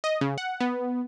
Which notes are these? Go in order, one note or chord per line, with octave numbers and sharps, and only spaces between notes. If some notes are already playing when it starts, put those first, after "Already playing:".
D#5
C#3
F#5
B3